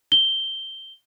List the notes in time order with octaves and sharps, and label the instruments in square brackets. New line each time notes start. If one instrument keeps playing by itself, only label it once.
[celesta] G7